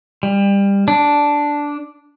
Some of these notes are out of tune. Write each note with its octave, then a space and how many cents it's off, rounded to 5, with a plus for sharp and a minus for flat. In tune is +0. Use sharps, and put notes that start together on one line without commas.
G3 +25
D4 -5